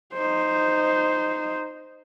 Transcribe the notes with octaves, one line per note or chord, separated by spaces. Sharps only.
D#4 C5